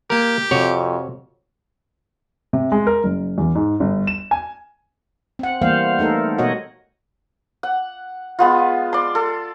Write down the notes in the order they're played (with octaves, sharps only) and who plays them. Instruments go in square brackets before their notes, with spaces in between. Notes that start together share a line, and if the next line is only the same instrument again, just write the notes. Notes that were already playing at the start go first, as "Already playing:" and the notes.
[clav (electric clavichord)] A#3 A#4 [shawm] G4
[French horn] F2 [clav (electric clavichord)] C3 F#4 C#5
[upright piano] C3
G#3
A#4
F#1
E2
G#2
G1
E7
G#5
[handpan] C4 F#5
E3 G3 A#3 B3 C5 F5
A3 D#4 A4 A#4
B2 B3 F#4 C#5 D#5 F#5
[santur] F#5
G#3 B3 F4
D5 C6
A4